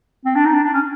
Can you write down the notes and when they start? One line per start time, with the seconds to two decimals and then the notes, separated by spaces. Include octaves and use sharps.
0.25 C4
0.35 D4
0.45 D#4
0.54 D4
0.64 D4
0.74 C#4